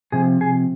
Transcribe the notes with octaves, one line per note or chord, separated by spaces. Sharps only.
C3 F3 G#4
G#4